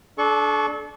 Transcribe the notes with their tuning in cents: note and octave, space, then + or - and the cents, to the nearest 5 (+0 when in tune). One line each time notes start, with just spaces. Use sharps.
D4 +0 A4 -35 C#6 +0